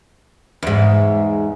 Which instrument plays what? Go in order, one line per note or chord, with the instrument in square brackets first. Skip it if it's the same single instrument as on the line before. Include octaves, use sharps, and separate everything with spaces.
[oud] E2 G#2